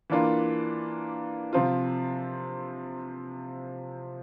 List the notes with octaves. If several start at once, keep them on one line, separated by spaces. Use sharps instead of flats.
E3 A#3 D4 F4
C3 F3 C4 F4